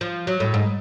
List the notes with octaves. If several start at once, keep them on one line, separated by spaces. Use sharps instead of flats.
F3
F#3
A2
G#2